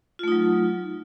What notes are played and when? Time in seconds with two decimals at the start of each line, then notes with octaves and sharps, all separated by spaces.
0.19 F4
0.23 A3
0.28 D#4
0.32 F#3